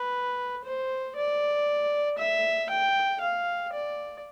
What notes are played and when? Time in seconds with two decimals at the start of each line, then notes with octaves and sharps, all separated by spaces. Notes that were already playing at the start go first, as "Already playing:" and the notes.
Already playing: B4
0.65 C5
1.16 D5
2.19 E5
2.70 G5
3.21 F5
3.73 D5